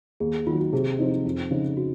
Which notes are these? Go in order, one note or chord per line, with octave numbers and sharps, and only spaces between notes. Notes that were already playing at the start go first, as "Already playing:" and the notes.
D#2 G#4
G#4
D#3 F#3 F4
F#4
C3 G#4
F3 C4 D#4
F2
C#3 F3 C4 D#4
F#4